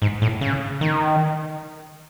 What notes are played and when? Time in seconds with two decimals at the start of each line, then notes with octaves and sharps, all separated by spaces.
0.02 G#2
0.22 A2
0.41 C#3
0.81 D#3